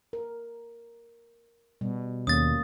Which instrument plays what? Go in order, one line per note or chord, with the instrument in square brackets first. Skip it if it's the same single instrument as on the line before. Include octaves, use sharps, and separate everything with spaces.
[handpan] A#4
[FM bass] B2 [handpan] G3
[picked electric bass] D#2 [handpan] A3 A#3 C#4 [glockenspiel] D#6 A6